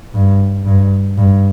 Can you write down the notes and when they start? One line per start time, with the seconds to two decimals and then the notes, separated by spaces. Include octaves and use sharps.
0.14 G2
0.66 G2
1.18 G2